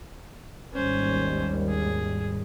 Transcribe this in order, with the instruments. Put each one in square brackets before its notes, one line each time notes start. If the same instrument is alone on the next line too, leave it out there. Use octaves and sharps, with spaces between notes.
[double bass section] G#1 D#2 G3 [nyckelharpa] C#4 C5
[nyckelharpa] G#4